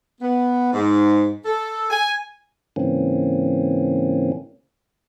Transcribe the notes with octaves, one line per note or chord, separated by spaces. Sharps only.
B3
G#2
A4
G#5
G#2 C#3 E3 A#3 C4 C#4